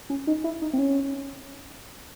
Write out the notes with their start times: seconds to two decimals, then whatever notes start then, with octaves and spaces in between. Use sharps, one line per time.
0.10 C#4
0.27 D#4
0.44 E4
0.62 D#4
0.73 C4
0.79 C#4